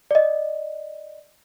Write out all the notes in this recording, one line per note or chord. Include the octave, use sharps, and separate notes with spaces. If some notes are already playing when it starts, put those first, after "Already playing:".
D5 D#5